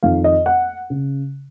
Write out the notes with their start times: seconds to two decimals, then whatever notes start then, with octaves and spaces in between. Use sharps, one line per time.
0.03 F2 D#3 F5
0.24 D#5
0.46 F#5
0.90 C#3